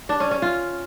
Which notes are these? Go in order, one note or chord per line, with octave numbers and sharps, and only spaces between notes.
D4
C#4
C#4
F4